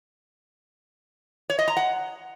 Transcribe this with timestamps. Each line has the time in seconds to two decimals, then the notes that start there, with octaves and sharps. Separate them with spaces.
1.50 C#5
1.59 D#5
1.68 A#5
1.77 F#5